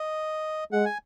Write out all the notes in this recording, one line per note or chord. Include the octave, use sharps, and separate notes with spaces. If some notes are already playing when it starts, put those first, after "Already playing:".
Already playing: D#5
G#3 F#5
G#5